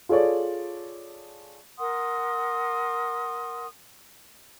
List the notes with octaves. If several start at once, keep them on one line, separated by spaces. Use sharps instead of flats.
F4 G#4 A4 C#5 D5
A#4 F#5 C6 D#6